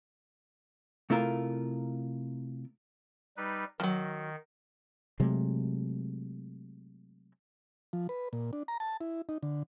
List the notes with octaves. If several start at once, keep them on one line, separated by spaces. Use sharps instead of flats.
C3 A3 E4 F4 A#4
G3 D#4 B4
D#3 F3 F#3
C3 F#3 G#3 A3
F3
B4
A#2
D4
A#5
A5
E4
D#4
D3